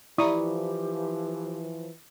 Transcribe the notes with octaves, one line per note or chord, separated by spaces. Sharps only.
E3 F3 E4 G4 D5 A#5 C#6 D#6